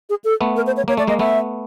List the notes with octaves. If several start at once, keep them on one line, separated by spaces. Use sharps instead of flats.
G#4
A4
A3 B3
A#4
C5
C#5
A#3 C#5
A3 D5
G#3 A#3 D#5
A3 B3 E5